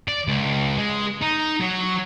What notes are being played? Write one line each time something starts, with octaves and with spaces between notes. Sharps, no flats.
D5
C#2
G#3
D#4
F#3